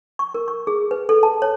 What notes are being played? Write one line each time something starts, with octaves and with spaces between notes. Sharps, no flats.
C#6
A#4
C#6
G#4
B4
A4
A5
C#5